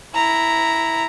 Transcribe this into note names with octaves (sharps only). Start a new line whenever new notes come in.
E4 A#5